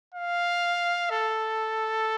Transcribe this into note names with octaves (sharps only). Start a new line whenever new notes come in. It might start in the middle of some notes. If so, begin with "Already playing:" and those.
F5
A4